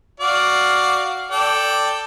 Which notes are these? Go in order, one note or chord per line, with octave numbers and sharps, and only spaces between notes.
F#4 D5 F5
A4 D5 G5